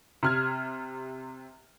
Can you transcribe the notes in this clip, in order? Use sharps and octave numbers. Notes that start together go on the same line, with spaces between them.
C3 F6 G#6